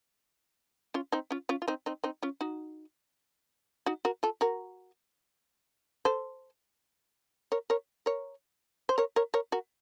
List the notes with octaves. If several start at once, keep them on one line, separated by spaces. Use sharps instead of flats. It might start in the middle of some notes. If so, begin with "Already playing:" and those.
C#4 F4
C4 D#4
C#4 F4
C#4 F4
F4
C4 D#4
C4 D#4
C4 D#4
C#4 F4
D#4 F#4
D#4 F#4
F#4 A#4
F4 A4
F#4 A#4
A4 C5
A#4 C#5
A#4 C#5
A#4 C#5
C5
A#4 C#5
A#4 C#5
A#4 C#5
F#4 A#4